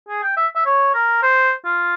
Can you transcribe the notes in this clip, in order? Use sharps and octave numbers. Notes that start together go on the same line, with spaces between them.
G#4
G5
E5
E5
C#5
A#4
C5
F4